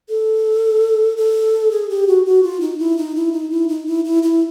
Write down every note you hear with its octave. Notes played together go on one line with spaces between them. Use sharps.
A4
A4
G#4
G4
F#4
F#4
F4
D#4
E4
D#4
E4
D#4
E4
D#4
E4
E4
E4